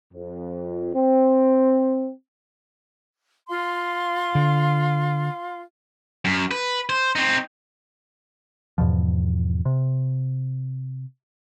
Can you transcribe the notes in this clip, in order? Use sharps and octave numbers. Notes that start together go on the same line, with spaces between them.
F2
C4
F4 F5 C6
D3
F#2
B4
C5
C4 D#4
E2 G#2 B2 F3
C3